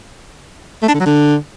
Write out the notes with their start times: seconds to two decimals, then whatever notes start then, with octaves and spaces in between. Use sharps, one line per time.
0.82 A3
0.88 D4
0.94 D3
1.00 F#3
1.06 D3